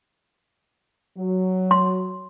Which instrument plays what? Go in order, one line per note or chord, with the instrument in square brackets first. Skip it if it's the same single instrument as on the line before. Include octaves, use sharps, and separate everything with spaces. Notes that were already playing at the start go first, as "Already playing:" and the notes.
[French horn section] F#3
[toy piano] C6